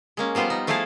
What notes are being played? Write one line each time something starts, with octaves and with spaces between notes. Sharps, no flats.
G#3 A#3 C#4
F3 G3 B3 F4 C5
D#4
F3 A3 E4 G#4 A4 F5